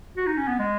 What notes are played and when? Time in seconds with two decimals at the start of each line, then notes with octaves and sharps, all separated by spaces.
0.17 F#4
0.27 D#4
0.37 C#4
0.48 B3
0.59 G#3